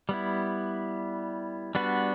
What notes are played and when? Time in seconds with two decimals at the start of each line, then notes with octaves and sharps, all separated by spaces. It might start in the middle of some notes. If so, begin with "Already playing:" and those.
0.09 G3 B3 E4
1.75 G3 B3 D4 F#4 B4